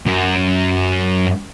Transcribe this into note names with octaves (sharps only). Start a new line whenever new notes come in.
F#2